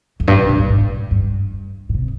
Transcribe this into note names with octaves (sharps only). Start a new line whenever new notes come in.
F2
G2
C3
C#3
A#2
G#2
G2
A#2
C3